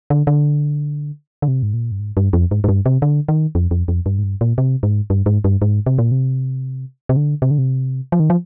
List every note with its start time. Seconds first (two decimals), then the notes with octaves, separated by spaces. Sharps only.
0.10 D3
0.27 D3
1.42 D3
1.48 C3
1.63 G#2
1.74 A#2
1.92 G2
2.00 G#2
2.17 G2
2.33 F2
2.51 G#2
2.64 G#2
2.69 G2
2.86 C3
3.02 D3
3.28 D#3
3.55 F2
3.71 F2
3.88 F2
4.06 G2
4.18 G#2
4.24 G2
4.41 A#2
4.58 C3
4.83 G#2
5.10 G2
5.26 G#2
5.44 G2
5.62 G#2
5.86 C3
5.98 A#2
6.11 C3
7.09 C3
7.17 D3
7.42 C3
7.51 D3
7.58 C3
8.12 F3
8.20 D#3
8.30 F3